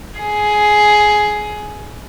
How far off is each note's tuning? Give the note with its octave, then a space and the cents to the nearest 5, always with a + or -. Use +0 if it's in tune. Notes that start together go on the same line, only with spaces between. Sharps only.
G#4 +10